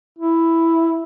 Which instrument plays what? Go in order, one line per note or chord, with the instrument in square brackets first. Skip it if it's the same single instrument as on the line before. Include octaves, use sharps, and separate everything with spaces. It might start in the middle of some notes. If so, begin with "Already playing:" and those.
[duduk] E4